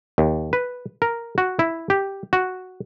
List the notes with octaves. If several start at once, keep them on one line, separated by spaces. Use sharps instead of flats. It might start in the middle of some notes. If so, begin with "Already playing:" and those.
D#2
B4
A#4
F#4
E4
G4
F#4